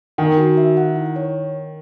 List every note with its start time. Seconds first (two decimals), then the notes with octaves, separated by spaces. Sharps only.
0.18 D#3 G#5
0.37 F#4
0.57 E5
0.77 F#5
0.96 E4
1.16 C#5